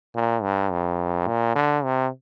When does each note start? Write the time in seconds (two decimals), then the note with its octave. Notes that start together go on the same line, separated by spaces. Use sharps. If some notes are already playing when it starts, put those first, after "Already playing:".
0.15 A#2
0.42 G2
0.72 F2
1.27 A#2
1.55 D3
1.84 C3